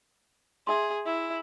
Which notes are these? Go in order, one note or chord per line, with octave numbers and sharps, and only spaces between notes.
G#4 E5 C6
E4